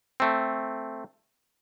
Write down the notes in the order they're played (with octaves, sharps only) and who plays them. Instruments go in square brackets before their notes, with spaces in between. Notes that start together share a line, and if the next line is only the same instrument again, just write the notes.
[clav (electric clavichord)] A3 C4